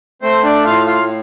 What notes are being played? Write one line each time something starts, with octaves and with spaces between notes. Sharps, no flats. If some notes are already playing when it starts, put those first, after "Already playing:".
A3 C4 C5
D4 D5
A2 F4 F5
F4 F5